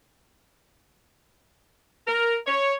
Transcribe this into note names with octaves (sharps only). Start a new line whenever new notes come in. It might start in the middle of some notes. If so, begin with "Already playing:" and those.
A#4
C#5